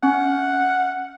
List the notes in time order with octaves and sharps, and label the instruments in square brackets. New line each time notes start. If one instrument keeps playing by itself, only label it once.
[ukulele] C#4 [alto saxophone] F#5